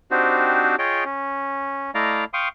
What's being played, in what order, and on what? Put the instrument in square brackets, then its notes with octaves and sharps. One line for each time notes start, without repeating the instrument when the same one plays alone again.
[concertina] C4 D4 D#4 F#4 G4 C5
F4 G#4 C#5 D#5 G5
C#4
A3 E4 D5 D#5 F5 A#5
F5 G5 C6 C#6 D#6